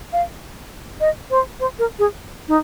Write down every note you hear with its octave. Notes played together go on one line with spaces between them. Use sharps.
F5
D#5
C5
C5
A#4
G#4
D#4